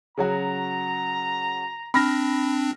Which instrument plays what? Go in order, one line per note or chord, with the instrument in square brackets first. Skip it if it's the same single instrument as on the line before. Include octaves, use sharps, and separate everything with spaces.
[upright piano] C#3 F#3 F#4 [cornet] A#5
[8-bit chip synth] C4 D4 [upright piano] B5 F6 A#6